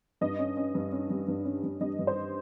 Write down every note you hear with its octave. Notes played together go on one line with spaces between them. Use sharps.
G2 D#5
C#4
C#4
G2
C#4
G3
G2
C#4
G2
G3 D#5
G2
C5